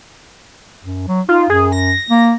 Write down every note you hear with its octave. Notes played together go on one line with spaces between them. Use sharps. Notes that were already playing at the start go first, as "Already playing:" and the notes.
F#2
F#3
D#4 F4
F#2 G#4
A#6
A#3